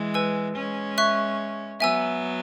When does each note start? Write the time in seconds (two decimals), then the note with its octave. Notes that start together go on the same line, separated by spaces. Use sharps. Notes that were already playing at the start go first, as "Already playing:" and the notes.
Already playing: E3 G#3
0.14 B4 G#5 E6
0.56 G#3 C#4
0.98 E5 C#6 F#6
1.80 F#3 B3 E5 G#5 E6